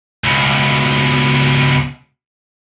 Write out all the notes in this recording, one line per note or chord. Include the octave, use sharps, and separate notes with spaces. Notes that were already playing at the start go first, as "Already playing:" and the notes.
C#2 B2